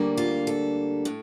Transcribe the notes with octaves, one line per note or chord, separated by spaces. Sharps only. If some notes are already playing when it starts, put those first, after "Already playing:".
Already playing: D2 D3 G3 A#3
F4
A4
A2